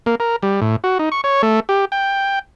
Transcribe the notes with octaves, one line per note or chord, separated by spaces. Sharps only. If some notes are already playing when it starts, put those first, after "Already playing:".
A#3
A#4
G3
A2
F#4
D#4
C#6
C#5
A3
G4
G5